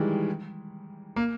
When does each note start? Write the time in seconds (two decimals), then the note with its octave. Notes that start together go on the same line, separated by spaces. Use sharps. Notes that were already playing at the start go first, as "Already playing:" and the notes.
Already playing: D#3 E3 G3 G#3
1.16 A#3